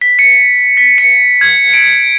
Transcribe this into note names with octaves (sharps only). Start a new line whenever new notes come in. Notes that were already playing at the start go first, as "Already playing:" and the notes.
B6
C#7
B6
C#7
G#6
D7